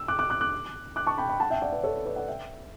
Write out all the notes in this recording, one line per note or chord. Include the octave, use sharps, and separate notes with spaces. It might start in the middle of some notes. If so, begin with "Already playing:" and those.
Already playing: E6
D6 F#6
D6 F#6
D6 F#6
D6 F#6
D6 F#6
A5 C#6
G5 B5
G5 B5
F#5 A5
E5 G5
D5 F#5
B4 D5
A4 C#5
B4
B4 D5
D5 F#5
E5 G5